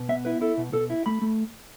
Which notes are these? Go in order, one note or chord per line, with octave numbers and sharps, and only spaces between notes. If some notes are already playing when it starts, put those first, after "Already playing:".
Already playing: B2
B3 E5
E4 B4
E4 A4
B2
B2 A4
E4
A3 B5
A3